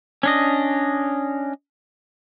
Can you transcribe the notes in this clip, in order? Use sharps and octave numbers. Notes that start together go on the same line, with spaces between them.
C#4 D4 D#5